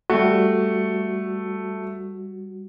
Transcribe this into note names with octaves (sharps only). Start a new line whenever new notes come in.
G3 A3 F#4